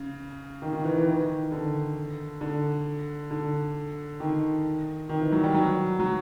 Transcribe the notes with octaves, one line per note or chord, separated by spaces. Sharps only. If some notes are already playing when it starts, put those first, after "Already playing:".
Already playing: C#3
D#3
D#3
E3
E3
D#3
D3
D3
D3
D#3
D#3
E3
F#3
G3
F#3
F#3